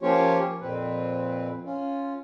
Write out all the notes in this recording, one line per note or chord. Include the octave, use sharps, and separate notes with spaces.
F3 A#3 C#4 F4 G4 C#5
F2 A#2 C4 B4
C#4 F4